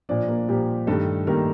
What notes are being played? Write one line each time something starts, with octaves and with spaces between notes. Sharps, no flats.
A#2 F3 D4 D5
A#3 A#4
A#2 F3 G3 G4
G2 D#3 G3 A3 A4
G2 D#3 G3 A#3 A#4